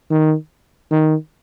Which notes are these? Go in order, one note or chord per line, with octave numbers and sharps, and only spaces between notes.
D#3
D#3